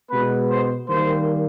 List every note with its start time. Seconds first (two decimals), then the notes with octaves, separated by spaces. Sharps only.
0.11 B2 G#3 B3 B4
0.49 C5
0.88 D#3 G3 A#3 C5